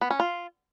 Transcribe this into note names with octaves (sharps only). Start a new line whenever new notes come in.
B3
C#4
F4